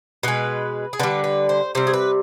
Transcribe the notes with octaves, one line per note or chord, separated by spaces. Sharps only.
B2 G#3 B4
G#4
D3 G3 B4
B4
C5
C3 G3 C5
G#4
B4